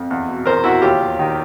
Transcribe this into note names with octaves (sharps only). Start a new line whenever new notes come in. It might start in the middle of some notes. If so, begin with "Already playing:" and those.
Already playing: F2
E2
B2
E2 A#4 C5
E2 E4 F#4
D#2 F4 G4
D#2
D#3